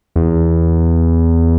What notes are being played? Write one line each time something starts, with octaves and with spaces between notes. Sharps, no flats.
E2